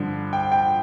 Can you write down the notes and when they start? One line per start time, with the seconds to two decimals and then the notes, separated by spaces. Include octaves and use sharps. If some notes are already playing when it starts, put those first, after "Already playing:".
Already playing: G2 D3 F3
0.33 G5
0.52 G5